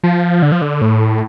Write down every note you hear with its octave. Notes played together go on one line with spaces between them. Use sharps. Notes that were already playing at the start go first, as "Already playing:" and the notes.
F3
D3
F3
D3
A2